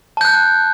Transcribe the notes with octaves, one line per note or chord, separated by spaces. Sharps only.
A5 F#6 G6